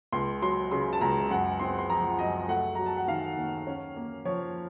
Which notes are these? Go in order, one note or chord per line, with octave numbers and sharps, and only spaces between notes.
C#2 C6
F#3 C6
C#3 C6
A5
C#2 A#5
F#2 F#5
C4 C6
C6
F3 A#5
F#2 D#5
A3 F#5
F#3 A#5
A5
F#5
D#3 F5
D#2
C#4
A#3
F3 C#5